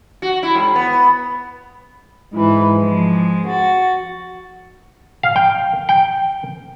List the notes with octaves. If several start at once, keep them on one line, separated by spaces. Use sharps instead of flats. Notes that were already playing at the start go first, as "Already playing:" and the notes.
F#4
E4
G#2
B3
G#2 E3 B4
F3 G#3
F#4 A6
F5
G5
G5